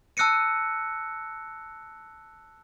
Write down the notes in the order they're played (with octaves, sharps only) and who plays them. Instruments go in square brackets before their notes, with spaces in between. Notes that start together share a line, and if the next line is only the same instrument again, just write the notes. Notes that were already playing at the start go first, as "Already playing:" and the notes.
[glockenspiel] A5 E6 F#6 A#6 C#7 D#7